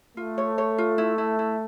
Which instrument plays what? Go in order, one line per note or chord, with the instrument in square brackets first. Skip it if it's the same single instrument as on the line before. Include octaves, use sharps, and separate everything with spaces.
[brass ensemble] A3 [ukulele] F4
[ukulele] C#5
C#5
F4
E4
E4
E4